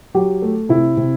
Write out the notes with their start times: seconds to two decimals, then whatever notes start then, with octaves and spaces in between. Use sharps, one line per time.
0.15 F#3 G4
0.42 A3
0.69 C3 E4
0.97 C3